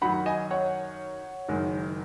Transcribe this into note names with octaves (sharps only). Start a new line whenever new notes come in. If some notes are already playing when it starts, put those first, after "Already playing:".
F#2 D#3 F#3 D#4 F#5 B5
D#5 G#5
C#5 F#5
F#1 F#2 D#3 G#3 D#4